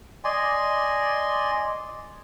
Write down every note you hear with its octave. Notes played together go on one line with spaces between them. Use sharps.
D5 D#5 G#5 C6